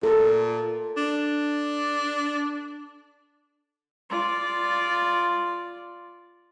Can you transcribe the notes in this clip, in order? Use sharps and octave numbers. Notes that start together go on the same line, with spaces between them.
A#2 A4
D4
F4 D5